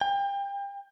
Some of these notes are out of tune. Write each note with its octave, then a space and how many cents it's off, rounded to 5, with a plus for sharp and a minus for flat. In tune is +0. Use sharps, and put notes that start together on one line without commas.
G5 +30